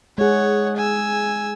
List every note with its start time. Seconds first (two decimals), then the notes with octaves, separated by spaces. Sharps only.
0.18 G#3 G#4 C#5 F#5
0.77 G#5 E6